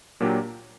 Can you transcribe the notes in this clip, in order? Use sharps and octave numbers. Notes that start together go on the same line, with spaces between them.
A#2 F#3 A#3 D4 G4